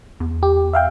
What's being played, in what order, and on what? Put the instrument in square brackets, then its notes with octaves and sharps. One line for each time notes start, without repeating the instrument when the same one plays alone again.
[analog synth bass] E2
[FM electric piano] G4
E5 F5 G5